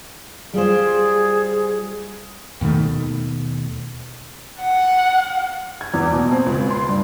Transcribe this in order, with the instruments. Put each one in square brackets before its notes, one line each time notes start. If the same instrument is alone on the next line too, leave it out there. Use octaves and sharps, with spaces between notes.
[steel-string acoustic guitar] G3 F4 C5 [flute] G#4
[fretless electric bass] D#2 B2 D#3 A3
[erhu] F#5
[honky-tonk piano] G#6
E2
B2
C4
C#2
C6
G2